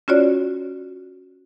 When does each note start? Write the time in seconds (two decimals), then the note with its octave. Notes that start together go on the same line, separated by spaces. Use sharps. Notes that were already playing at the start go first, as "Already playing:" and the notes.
0.08 C#4 F4 F#4 C#5 D5